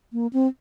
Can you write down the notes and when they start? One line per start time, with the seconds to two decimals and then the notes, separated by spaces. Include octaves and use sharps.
0.13 A#3
0.33 C4